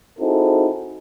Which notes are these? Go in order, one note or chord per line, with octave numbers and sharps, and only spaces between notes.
C4 D#4 E4 F#4 G#4 A4